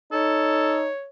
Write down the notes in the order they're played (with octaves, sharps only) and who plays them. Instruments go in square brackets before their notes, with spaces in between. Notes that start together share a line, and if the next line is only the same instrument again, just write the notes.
[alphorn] D#4 [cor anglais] A4 [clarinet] C#5